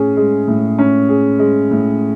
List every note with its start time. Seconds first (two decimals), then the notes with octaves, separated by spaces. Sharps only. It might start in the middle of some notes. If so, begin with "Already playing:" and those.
Already playing: A2 C#4 G#4
0.17 G#3
0.48 A2
0.79 C#4
1.09 G#4
1.39 G#3
1.71 A2